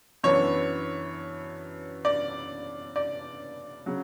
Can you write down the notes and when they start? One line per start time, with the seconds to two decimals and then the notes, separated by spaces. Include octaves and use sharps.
0.24 F#2 E3 B3 D4 C#5
2.05 D5
2.96 D5
3.86 C#3 F#3